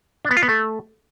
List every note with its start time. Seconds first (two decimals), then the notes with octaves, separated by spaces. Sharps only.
0.25 D4
0.31 B3
0.37 F4
0.43 B3
0.49 A3